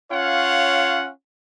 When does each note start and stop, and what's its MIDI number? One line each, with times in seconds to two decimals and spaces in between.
0.12 1.09 61
0.12 1.09 65
0.12 1.09 73
0.12 1.09 77
0.12 1.09 78